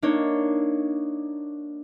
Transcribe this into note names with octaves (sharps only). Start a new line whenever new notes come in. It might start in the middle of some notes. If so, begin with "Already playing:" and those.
A#3 D4 D#4 C#5